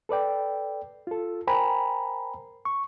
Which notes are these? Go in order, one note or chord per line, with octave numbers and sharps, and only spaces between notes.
A4 B4 D5 G5
F4 A4
A#4 C5 G5 G#5 A#5 B5
C#6